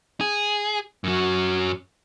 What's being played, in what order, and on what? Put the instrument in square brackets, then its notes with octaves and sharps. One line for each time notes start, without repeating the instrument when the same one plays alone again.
[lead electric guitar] G#4
F#2 F#3